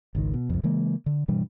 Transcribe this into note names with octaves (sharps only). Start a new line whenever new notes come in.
G#1 C#2 D#3
B2
C2 F2
C#3 E3 G#3 A#3
D3
G2 B2 E3 G3